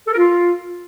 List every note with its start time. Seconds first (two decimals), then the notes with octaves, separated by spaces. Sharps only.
0.06 A4
0.12 A#4
0.17 F4